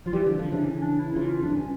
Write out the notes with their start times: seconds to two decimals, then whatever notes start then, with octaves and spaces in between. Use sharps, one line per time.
0.06 F3 F4
0.13 E3 G3 G4
0.26 D3 F3
0.39 D3 F3
0.48 C#3 E3 D4
0.65 C#4
0.82 D4
0.99 E4
1.16 C#3 E3 F4
1.29 F4
1.42 F2 D4
1.50 G2
1.55 C#4